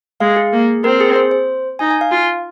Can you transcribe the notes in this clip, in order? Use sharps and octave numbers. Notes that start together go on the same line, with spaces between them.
G#3 F5
G#4
A#3
C4 A#4
G#4
C5
C5
D#4 G#5
G#5
F5
F4